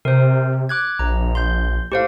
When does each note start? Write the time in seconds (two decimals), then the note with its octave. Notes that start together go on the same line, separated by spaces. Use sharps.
0.05 C3 A#4 C5
0.69 D6 F#6 G#6
0.99 A#1 A#5
1.35 C6 G6
1.92 A2 G4 C5 F5